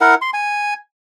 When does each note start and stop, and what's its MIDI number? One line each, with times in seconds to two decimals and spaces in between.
0.01 0.15 64
0.01 0.15 70
0.01 0.15 78
0.22 0.30 84
0.33 0.74 80